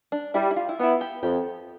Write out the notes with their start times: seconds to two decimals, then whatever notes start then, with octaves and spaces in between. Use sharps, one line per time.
0.12 D4
0.34 G3 E4
0.51 E4
0.56 F4
0.69 E4
0.79 B3 E4 F4
1.01 G4
1.23 F2 G4